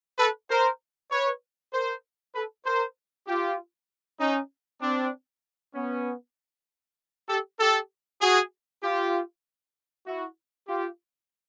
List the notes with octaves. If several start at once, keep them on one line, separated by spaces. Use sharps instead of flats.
A4 B4
A#4 C5
B4 C#5
A#4 C5
A4 B4
A#4 C5
F4 G4
C#4 D#4
C4 D4
B3 C#4
G4 A4
G4 A4
F#4 G#4
F4 G4
E4 F#4
F4 G4